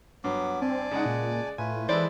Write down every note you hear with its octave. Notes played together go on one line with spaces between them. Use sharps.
G2 F#3 B3 D6
C4 D5 G#5 A5
C#3 G#3 D#4 F#5
A#2
A2 A3 F4 B4 G#5
E3 G#3 E4 A4 B4 C5 D5